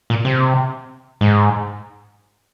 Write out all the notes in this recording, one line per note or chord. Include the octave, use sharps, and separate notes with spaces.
A#2
C3
G#2